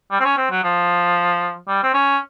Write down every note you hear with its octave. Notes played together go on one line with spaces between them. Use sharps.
G3
C4
C#4
C4
F#3
F3
G3
C4
C#4